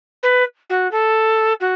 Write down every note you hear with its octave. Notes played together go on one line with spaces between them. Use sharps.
B4
F#4
A4
F#4